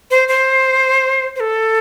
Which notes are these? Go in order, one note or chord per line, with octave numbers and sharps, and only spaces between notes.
C5
C5
C5
A4